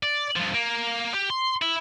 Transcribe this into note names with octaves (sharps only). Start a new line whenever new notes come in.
D5
G2 F3
A#3
G4
C6
E4